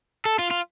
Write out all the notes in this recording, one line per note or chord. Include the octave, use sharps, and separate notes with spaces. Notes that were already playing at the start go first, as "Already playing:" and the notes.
A4
F4
F4